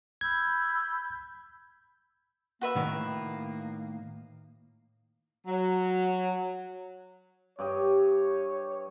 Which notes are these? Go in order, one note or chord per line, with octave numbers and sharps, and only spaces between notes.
B5 E6 G6 G#6
A#3 F#4 B4 E5
A2 D#3
F#3
G2 G4 C#5 D#5